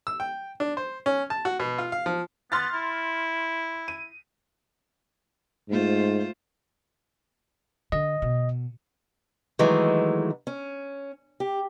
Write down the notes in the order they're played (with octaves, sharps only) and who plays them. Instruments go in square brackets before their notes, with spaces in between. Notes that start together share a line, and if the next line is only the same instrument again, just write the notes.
[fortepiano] E6
G5
D4
C5
C#4
A5
F#4
B2
F4
F5
F3
[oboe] B3 [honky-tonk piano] C6 F6 A6
[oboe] E4
[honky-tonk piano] D#7
[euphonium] G#2 [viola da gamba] A3 F4 C5
[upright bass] D3 [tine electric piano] D#5
[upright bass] B2
[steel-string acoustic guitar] D#3 E3 F#3 G#3 A3
C#4
G4